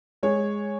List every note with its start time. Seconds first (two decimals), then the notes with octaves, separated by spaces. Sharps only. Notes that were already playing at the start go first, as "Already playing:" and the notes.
0.23 G#3 C#5